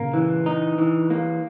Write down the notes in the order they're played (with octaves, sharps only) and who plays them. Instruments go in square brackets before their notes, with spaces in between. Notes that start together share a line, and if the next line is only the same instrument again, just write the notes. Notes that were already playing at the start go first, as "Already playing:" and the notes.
Already playing: [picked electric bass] A#2 C#3 [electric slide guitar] A#3
[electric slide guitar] E3
D#4
E3
A#3